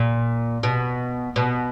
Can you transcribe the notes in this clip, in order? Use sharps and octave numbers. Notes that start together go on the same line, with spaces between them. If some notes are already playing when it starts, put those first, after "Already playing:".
Already playing: A#2
B2
B2